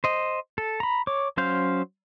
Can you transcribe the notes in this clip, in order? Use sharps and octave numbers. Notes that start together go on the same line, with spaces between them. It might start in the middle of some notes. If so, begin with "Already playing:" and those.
C5 D#5
A4
A#5 B5
C#5 D6
F#3 C#4 C5 F5 G6